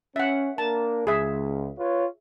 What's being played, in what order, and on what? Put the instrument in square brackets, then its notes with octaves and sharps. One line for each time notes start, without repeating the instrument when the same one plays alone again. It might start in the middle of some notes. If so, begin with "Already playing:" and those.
[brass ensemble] C#4 [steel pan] E5 F#5
[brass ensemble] A#3 D4 A#4 [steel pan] A5
[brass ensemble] C#2 [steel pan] G#4 E5
[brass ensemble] F4 B4 C#5